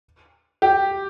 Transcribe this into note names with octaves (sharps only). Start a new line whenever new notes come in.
G4